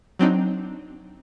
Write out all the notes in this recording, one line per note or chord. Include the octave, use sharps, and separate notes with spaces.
F#3 C4 D4 D#4